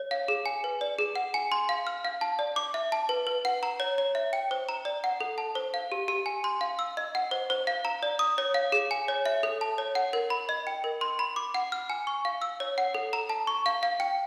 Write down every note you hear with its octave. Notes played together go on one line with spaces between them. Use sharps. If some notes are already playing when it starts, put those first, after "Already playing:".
Already playing: C#5
F5
G#4
G#5
B4
D5
G#4
F#5
G#5
C6
F5
F6
F5
A5
D5
D6
E5
A5
B4
B4
F#5
A#5
C#5
C#5
E5
G5
C5
A#5
D5
F#5
A4
A5
C5
F5
G4
G4
G#5
C6
F5
E6
D#5
F#5
C5
C5
F5
A#5
D5
D#6
C#5
F5
G#4
G#5
C#5
E5
A4
A5
C#5
F#5
A#4
B5
D#5
G5
A#4
C6
B5
D6
F#5
F6
G#5
C#6
F5
E6
C#5
F#5
A4
A#5
A5
C#6
F5
F5
G5